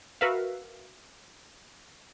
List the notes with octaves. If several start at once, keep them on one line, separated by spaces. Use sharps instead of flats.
F#4 A#4 B4 E5 F5